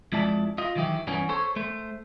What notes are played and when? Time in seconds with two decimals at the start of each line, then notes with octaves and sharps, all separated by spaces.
0.12 F2 G#3 E4 D5 A5
0.58 F4 D#5
0.76 D#3 E3 F#3 E4 G4
1.07 G2 E3 B3 C#4
1.29 A4 C5 C#5
1.56 A3 C5